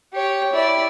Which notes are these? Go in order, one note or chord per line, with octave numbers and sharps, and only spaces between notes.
G4 C#5
E4 D5